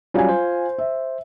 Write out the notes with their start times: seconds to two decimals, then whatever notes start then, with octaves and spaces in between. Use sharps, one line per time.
0.14 F#3 G3 C#4 F4 F5 G#5
0.29 C5
0.78 E5